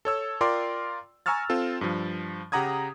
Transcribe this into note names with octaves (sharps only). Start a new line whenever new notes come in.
A4 C#5 E6
F4 A#4 D5 G5 C6 D6
G#5 A#5 C#6 E6 F6 A6
C4 F4 A4
G2 F3
C#3 G4 F#5 A#5 D#6 G#6